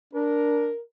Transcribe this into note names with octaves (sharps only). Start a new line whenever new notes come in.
D4 A#4